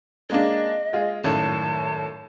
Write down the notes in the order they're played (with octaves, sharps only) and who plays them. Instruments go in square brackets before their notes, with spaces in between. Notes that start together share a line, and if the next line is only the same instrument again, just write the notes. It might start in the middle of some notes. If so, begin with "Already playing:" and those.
[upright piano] G#3 A#3 D4 [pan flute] D#5
[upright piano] G#3 F4 G#4
[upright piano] G#1 F#2 A2 [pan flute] A5